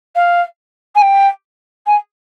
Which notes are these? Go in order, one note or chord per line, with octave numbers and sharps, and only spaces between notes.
F5
G#5
G5
G#5